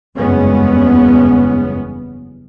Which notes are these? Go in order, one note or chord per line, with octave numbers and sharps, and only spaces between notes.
F#1 E2 G2 G#3 B3 C#4